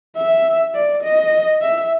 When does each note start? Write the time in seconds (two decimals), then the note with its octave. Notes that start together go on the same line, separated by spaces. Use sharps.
0.16 E5
0.75 D5
1.03 D#5
1.62 E5